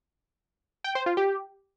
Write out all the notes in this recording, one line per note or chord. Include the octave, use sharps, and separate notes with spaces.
G5
C5
F4
G4